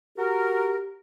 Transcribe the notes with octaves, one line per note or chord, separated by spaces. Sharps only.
F#4 G4 A#4